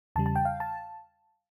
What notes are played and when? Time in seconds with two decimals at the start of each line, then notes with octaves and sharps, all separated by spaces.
0.16 E2 C#3 G3 A5
0.26 A5
0.36 G5
0.45 F5
0.60 A5